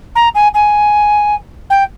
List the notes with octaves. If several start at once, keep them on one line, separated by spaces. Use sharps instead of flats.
A#5
G#5
G#5
G5